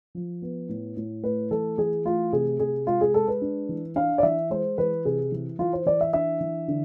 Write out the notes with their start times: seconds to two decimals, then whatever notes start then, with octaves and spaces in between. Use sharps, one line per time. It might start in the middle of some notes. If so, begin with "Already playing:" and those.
0.15 F3
0.42 B3
0.69 A2
0.97 A2
1.24 A3 B4
1.51 E3 A4
1.78 E3 G#4
2.05 A3 F4
2.33 C3 G#4
2.60 C3 G#4
2.87 G#3 F4
3.01 G#4
3.14 G#3 A4
3.28 B4
3.42 D4
3.69 E3
3.96 D4 F5
4.18 D5
4.23 E3 E5
4.50 G#3 C5
4.78 E3 B4
5.05 C3 G#4
5.32 E3
5.59 E3 F4
5.73 C5
5.86 E3 D5
6.01 E5
6.13 D4 E5
6.41 E3
6.68 D3